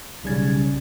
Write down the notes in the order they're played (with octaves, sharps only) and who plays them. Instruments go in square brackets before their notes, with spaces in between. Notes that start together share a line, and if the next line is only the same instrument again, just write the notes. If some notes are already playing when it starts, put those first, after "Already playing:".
[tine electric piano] B1 C#3 G3 C#4 G#6 A6